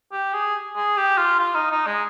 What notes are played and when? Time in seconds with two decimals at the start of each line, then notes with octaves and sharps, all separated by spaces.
0.12 G4
0.33 G#4
0.76 G#4
0.97 G4
1.18 F4
1.39 F4
1.55 D#4
1.71 D#4
1.87 G#3